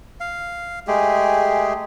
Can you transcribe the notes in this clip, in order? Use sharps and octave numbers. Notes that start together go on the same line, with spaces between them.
F5
G#3 A3 G4 G#4